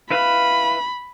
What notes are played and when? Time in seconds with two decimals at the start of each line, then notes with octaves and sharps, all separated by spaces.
0.11 E4 B4 F5 B5